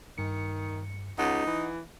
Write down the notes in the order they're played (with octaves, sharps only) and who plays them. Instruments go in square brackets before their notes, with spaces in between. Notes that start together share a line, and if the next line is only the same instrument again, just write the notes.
[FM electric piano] G2 C#7 [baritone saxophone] D#3
[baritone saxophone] C#2 [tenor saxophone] D#4 [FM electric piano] F#5
[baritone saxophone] E3